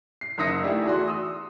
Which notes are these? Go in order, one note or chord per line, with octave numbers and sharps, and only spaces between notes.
C7
F#1 D#4 E5 D#6 A#6 C#7
A3 D4 E4 G4 G#4 D5
E2 F#4 C6
D#6 E6